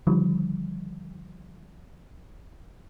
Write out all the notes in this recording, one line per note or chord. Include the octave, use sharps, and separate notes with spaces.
D3 D#3 F3 G3